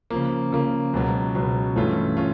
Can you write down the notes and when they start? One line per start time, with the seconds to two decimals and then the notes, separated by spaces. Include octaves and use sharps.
0.10 C#3 F3 A#3
0.52 C#3 F3 A#3
0.93 C#2 B2 F#3
1.35 C#2 B2 F#3
1.76 G2 E3 A3 C#4 F4
2.17 C#4 F4